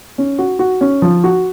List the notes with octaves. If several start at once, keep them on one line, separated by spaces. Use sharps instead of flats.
C#4
F#4
F#4
C#4
F3
F#4